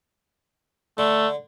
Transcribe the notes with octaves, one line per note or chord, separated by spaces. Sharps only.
D3 A3